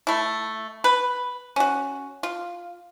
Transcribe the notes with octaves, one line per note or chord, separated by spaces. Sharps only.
A3 E4
B4
C#4 F#4
F4